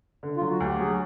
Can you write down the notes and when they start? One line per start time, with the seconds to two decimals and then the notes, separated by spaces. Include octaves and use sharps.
0.23 D3
0.37 F#3 F4
0.52 F#4
0.60 D2 G4
0.79 F#3 G#4